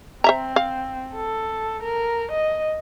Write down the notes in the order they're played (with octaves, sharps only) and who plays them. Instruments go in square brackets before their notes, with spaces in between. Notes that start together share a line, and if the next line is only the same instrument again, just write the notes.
[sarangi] C4 [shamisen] C5 E5 A#5
[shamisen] F5
[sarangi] A4
A#4
D#5